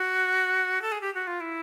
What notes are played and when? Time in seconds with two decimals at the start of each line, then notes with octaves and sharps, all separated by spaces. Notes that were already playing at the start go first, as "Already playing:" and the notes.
Already playing: F#4
0.82 A4
0.92 G#4
1.01 G4
1.14 F#4
1.27 F4
1.40 E4